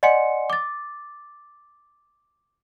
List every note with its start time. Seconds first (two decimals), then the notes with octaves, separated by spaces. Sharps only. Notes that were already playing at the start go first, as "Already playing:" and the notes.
0.03 D5 D#5 F#5 G#5 C6 C#7
0.50 D6 A6